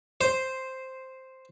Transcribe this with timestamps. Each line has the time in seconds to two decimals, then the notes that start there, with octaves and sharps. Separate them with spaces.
0.21 C5